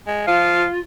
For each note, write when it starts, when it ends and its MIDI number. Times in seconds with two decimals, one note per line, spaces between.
0.07 0.26 56
0.27 0.65 53
0.27 0.80 65
0.27 0.68 77